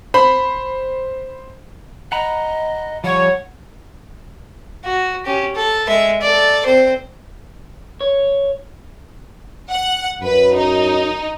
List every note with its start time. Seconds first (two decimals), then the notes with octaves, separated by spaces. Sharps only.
0.14 C5 B5
2.12 D#5 F#5 A#5 B5
3.04 F3 G3 C#5 F#5
4.85 F#4
5.26 C#4 G4
5.56 A4
5.88 G#3 E5
6.22 A4 D5
6.66 C4 C5
8.01 C#5
9.71 F#5
10.23 F#2 B4
10.55 D#4